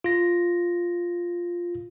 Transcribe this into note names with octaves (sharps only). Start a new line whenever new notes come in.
F4 A#6